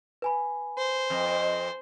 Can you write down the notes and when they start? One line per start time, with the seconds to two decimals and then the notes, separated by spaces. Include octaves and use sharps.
0.22 B4 G#5 B5
0.78 C5
1.10 F2